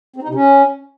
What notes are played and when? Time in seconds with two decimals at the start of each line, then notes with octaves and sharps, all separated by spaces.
0.16 C4
0.22 D#4
0.29 C3
0.35 C#4